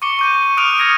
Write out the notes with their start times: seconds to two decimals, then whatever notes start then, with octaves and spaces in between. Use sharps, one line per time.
0.02 C#6 D6 C#7 G7
0.19 C#6 G6 D#7
0.34 C#6
0.57 D#6 F6 F#6 D7 D#7 F7
0.78 D#6 F6 G#6 A#6 C#7 F7